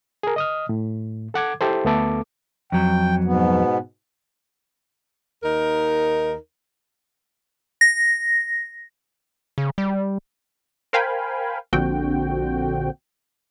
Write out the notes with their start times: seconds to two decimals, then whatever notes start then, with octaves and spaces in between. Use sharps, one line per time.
0.23 G#4 A#4
0.36 D#5 D#6 F6
0.69 A2
1.34 A4 F#5 D6 G#6
1.61 E4 G4 A4 C5
1.85 D2 A3 B3 A4 D6
2.72 F2 F#3 G5
3.24 G#2 B2 B3
5.43 D#2 D#4 A#4
7.81 A#6
9.58 C#3
9.78 G3
10.93 A#4 C5 F5 G5 G#5 B5
11.73 A#1 D3 C4 F#4 G5